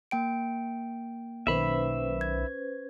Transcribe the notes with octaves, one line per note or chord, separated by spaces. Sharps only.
A#3 G5 D7
B1 D#3 C#4 B4 C5 E5 B5
G#6